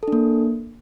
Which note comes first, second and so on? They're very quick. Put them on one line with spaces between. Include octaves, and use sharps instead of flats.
A4 D4 A#3